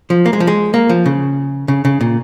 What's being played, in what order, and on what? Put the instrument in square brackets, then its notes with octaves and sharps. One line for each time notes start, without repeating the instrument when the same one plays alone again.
[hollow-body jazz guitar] F3
A#3
G#3
F3
G#3
A#3
F3
C#3
C#3
C#3
A#2